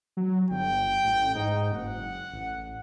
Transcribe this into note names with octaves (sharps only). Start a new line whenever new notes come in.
F#3
G1 G5
A1
G#2 D#4
F#1 F#5
A1